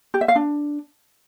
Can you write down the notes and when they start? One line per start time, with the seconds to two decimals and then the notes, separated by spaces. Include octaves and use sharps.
0.14 G4
0.21 E5
0.28 F5
0.36 D4